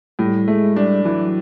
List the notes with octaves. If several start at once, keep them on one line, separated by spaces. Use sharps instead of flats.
A2 G3
G#3 A3
G3 D4
E3 F#3